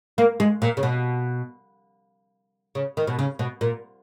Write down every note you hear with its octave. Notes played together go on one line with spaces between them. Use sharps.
A#3
G#3
A#2
C#3
B2
C#3
D#3
B2
C#3
B2
A#2